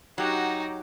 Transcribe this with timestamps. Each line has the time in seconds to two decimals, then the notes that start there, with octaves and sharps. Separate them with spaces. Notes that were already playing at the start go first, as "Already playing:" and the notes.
0.18 F#3 D#4 F#4 G4